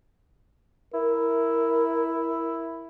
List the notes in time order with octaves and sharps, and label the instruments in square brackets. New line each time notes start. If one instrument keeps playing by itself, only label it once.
[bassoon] E4 [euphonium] A#4